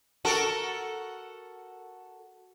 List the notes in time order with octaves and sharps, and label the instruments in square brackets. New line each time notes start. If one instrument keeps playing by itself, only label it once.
[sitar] F#4 A4 A#4